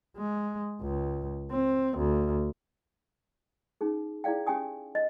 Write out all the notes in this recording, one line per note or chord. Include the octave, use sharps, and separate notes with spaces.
G#3
C#2
C4
D2
C#4 D#4 G#4
E4 G#4 D5 F5 G5
C#4 G4 G5 G#5 D#6
D#5